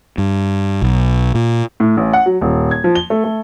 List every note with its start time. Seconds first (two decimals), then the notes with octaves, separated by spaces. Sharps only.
0.18 G2
0.82 B1
1.35 A#2
1.80 A2
1.97 A1
2.13 F#5
2.26 F#3
2.41 D#1
2.71 G#6
2.84 F3
2.95 G7
3.10 A3
3.24 A3